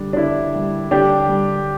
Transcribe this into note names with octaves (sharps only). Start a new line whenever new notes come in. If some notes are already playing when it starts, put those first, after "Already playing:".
Already playing: D3 G3 D4
D4
D3 E4
G3
D3 D4 G4
G3